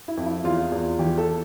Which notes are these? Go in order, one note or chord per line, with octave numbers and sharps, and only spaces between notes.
E4
F2
E4
E2 F4
E2
E3 G4
A4